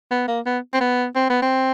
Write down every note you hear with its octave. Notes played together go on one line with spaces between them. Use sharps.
B3
A#3
B3
C4
B3
C4
B3
C4